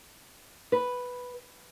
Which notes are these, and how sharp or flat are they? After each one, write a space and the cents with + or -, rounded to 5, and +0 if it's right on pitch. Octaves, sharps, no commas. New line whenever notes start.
B4 +0